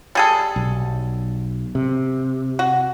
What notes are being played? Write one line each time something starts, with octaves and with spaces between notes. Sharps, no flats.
G3 G#4 A4
B1
C3
F#4